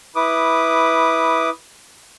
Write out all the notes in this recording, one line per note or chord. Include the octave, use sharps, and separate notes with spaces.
E4 B4 D6 D#6